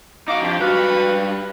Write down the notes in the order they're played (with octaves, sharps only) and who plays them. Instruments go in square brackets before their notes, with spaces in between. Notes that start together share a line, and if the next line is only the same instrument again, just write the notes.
[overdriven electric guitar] D#4 F#4 [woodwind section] F5 D6
[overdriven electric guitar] F2 [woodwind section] D4 F4 G4
[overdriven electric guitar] G2 F5 [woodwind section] F#4 B4